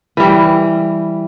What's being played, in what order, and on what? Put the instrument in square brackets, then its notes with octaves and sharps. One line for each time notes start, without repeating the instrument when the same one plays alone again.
[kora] E3 G3